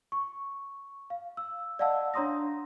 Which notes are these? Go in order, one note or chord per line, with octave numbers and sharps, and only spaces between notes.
C#6
F5
E6
D5 D#5 F5 F#5 A5 E6
D4 C#5 A#5 C6 D#6 A#6